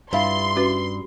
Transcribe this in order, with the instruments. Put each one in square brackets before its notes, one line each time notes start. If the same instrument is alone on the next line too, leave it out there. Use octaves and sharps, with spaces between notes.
[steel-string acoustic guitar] G2 [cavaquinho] E4 F4 A5 [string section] C6
[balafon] C#4 F#4 B4